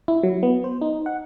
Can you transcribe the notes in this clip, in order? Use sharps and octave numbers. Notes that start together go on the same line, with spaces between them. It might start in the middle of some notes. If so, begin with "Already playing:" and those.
E4
F#3
B3
C5
D#4
F#5